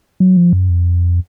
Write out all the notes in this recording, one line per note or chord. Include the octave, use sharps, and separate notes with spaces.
F#3
F3
F#2
F2